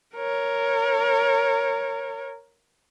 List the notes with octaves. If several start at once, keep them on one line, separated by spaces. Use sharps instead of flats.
A#4 C#5